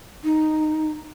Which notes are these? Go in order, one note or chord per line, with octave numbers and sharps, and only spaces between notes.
D#4